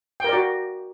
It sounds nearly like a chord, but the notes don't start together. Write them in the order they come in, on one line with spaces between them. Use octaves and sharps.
G5 A#4 D5 F#4